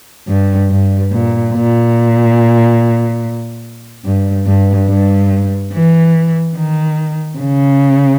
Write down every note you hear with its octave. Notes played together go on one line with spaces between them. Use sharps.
G2
G2
A#2
A#2
G2
G2
G2
E3
D#3
C#3